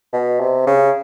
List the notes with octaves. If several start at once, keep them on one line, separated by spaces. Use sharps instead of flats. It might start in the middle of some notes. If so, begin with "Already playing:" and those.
B2
C3
C#3